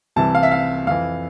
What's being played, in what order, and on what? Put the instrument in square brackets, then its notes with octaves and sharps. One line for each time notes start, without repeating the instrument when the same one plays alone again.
[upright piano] C2 C3 E3 A5
F5
E5
F5
F2 E3 F5